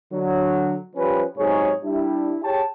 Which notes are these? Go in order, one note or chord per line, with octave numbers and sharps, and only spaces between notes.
D3 F#3
F3 G3 C#4 B4
G#2 C3 F#3 D#4 G#4 C#5
G3 D4 E4
G4 G#4 C#5 G5 A5